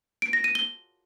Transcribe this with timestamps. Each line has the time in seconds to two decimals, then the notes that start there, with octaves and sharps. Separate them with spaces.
0.22 D7
0.33 A#6
0.44 D#7
0.55 G7